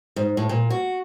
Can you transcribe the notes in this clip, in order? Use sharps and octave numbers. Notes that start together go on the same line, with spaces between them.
G#2
A2
A#2
F#4